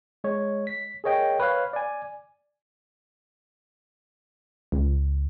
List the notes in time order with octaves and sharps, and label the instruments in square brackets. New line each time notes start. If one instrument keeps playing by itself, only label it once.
[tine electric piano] G#3 C#5
B6
G#4 A#4 C#5 D#5 G5
B4 C#5 F5
D5 G#5
[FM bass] C#2